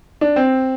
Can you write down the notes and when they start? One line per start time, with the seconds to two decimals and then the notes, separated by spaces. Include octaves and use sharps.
0.21 D4
0.36 C4